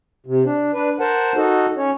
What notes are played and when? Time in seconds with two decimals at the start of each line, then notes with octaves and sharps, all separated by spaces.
0.26 C3
0.45 D4
0.74 D4 B4
1.00 A#4 C5 F#5 A5
1.36 D#4 F#4 A4
1.77 C#4 C#5